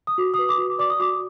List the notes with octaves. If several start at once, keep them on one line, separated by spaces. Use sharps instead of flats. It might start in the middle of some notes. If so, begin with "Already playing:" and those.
D#6
F#4 D6
D#6
B4
D6
F#4
D5 D6
D#6
F#4 D6